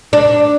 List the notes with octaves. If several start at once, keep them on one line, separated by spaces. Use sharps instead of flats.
D4